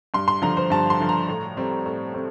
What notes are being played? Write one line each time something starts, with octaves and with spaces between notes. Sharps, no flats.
G2 C6
C6
D3 F3 A#5
C5
G2 A5
C6
D3 F3
A#5
A2
G3 C4
A2
G3 C4